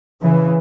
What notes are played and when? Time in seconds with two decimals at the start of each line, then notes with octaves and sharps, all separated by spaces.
0.23 C#3 E3